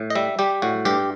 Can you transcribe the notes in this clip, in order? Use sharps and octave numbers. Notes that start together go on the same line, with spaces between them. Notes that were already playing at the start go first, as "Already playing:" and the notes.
Already playing: A2
D#5
G3 E5
G3 G4
A2 F#4
G2 G4